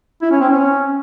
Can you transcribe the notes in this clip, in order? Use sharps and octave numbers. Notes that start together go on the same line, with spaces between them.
E4
C#4
C4
C#4